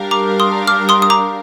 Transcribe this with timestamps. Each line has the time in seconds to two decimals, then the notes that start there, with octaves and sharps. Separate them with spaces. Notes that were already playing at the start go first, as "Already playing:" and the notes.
Already playing: G3 D4 G4 A#4 F5
0.11 A#5 D6
0.40 C6 D#6
0.67 D6 F6
0.89 C6 D#6
1.02 D#6
1.10 A#5 D6